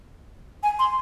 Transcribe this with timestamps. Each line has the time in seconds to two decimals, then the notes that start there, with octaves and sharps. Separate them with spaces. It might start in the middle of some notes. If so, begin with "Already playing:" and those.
0.63 G#5
0.79 C6